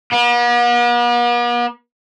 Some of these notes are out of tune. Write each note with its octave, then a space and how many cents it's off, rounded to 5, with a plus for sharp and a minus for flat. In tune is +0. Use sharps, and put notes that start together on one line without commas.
B3 -45